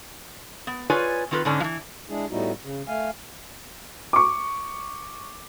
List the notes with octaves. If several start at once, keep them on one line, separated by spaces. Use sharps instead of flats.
B3
F4 G#4 B4 C#5 D5 G#5
D#3 C4 F4 A4 B4
G#2 D3 G#3 C#4 D4
E3 F3
G#3 D4 E4 G#4
A2 G3 B3 D#4 E4 F#4
C#3
A3 F5 G#5
C#6 D6